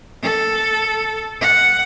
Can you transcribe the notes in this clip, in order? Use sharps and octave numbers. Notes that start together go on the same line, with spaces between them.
A4
F#5